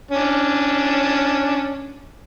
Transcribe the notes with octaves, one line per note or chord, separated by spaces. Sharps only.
C#4 D4